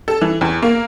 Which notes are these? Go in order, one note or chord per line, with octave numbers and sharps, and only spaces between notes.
A4
E3
E2
A#3